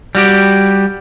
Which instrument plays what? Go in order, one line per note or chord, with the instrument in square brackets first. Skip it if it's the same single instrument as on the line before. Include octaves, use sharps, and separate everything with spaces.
[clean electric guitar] G3 F#4 G4